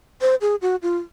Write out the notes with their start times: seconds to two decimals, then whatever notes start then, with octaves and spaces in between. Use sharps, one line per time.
0.21 C5
0.41 G#4
0.62 F#4
0.82 F4